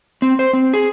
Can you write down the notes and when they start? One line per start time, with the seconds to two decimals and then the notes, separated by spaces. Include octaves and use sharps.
0.22 C4
0.39 C5
0.53 C4
0.73 G#4